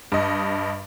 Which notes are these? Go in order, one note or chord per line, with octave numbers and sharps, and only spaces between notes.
G2 D#5